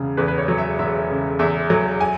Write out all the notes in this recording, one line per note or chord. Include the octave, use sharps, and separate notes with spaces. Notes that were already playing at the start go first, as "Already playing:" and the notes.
Already playing: E1 C#3
E2 B4
B4
C#5
F#3
E5
E1 E5
C#3
E2 E5
F#3
G#5